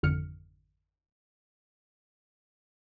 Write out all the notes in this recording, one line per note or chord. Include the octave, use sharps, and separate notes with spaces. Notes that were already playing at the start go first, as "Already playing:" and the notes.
G#1 F2 D3 F6 C#7